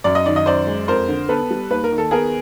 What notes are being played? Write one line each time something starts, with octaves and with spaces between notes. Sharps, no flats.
F#2 D5
D#5
D#3 D5
D#5
F#2 C5 D5
G#3
F2 A#4 C5
D3
B3 A4 B4
G3
D#2 B4
A#4
D#3
A4
B3 G#4 A#4